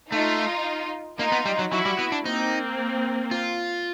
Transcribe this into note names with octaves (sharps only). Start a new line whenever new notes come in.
A3 D#4 F4
A#3 D#4 F4
B3
G3
F#3
F#3 E4 F#4
G3
B3
D4
A#3 C4 D#4
F4